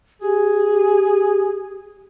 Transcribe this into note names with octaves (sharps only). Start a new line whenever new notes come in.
G4 G#4